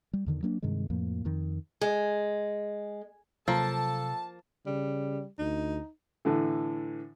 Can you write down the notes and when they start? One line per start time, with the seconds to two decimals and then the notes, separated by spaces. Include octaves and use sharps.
0.13 G3
0.26 E2 D3 D#3
0.43 F#3 A#3 D4
0.63 G2 C3 D#3 G#3
0.90 F2 A2 F3 A#3
1.25 F2 D#3
1.81 G#3
3.48 C3 F3 F#3 A#3 A4 A5
4.66 C#3 G3
5.39 D2 D#4
6.25 A2 D3 E3